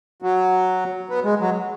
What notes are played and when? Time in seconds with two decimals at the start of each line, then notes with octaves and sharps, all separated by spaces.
0.22 F#3
1.10 B3
1.24 G#3
1.40 F#3